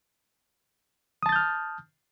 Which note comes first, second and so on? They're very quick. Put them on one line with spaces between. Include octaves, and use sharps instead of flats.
D#6 A5 A6 G6 F6